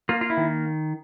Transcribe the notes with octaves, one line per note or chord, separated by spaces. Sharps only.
A#3 F4
F4
E4
D#3